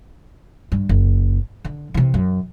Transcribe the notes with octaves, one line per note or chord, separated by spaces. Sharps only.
G2
F#1
D3
C3 E3
F#2